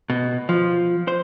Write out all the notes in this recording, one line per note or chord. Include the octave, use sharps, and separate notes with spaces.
B2
F3
C5